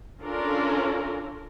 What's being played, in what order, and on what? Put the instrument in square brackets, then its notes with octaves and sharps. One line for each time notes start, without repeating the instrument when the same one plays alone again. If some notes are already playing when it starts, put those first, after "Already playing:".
[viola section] C#4 D4 F4 A4 A#4